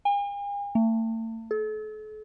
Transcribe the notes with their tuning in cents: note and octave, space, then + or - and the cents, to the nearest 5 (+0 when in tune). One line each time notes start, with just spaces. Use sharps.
G#5 -45
A3 +40
A4 -40